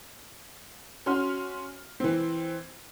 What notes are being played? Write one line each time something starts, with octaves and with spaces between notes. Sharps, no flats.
C#4 F#4 C6 F6
E3 C4